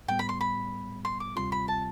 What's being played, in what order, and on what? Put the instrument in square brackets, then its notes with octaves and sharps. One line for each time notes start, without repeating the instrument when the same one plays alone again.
[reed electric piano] A2 G3 B3 [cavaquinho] G5
[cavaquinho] B5
C6
B5
C6
D6
[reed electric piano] D2 C3 G3 C4 F4 [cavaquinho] C6
[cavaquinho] B5
A5